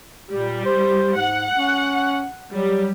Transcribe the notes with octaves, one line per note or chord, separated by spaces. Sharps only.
A#2 G3
C5
G#2 F#5
C#4
F#3 G3